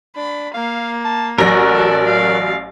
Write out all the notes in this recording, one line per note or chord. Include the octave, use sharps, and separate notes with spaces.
D4 B5
A#3 F5
A5
A1 F#3 F#4 A#4 D5 A#6
A4
F5